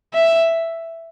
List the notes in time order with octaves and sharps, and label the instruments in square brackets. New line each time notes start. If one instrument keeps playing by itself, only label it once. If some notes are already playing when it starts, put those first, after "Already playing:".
[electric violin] E5